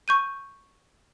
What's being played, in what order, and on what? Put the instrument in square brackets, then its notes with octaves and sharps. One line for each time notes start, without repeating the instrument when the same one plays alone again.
[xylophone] C#6 G6 D#7